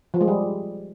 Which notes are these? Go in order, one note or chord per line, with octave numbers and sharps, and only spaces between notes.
F3
G#3
G3